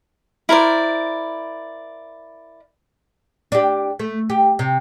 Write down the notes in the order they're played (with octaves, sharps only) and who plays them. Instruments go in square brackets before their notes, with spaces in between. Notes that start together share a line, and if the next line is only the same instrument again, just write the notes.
[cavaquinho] E4 A#4 C5 D5
[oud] D4 G4
A3
G4
C3